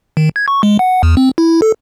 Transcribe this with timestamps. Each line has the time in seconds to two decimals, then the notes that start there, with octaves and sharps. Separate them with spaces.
0.17 D#3
0.36 G#6
0.48 C#6
0.63 G#3
0.79 F#5
1.03 E2
1.17 C4
1.38 E4
1.62 A4